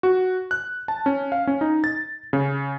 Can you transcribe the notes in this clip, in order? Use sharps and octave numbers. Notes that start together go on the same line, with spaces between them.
F#4
F#6
A5
C#4
F5
C#4
D#4
A6
C#3